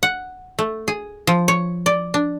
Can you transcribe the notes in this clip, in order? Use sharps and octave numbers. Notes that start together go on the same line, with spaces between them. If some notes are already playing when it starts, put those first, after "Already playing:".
F#5
A3
G#4
F3
C#5
D5
D4